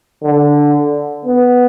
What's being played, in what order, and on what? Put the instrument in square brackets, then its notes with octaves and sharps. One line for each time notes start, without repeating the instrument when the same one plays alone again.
[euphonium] D3
B3